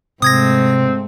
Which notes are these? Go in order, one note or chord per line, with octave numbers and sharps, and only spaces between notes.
G#2 C3 A3 C4 D#6 G#6 A#6